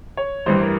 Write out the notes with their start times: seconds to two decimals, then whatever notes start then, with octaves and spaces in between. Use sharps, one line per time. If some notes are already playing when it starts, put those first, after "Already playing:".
0.17 C#5
0.46 A1 G2 E3 G3 C5
0.61 A#4